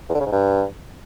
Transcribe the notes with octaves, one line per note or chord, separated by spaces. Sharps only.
E2
D3
C#3
G#2
G2